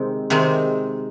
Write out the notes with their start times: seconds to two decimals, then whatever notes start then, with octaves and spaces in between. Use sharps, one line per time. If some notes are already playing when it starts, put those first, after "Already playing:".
Already playing: C3 D#3 G#3 C4
0.30 C3 D#3 G#3 C4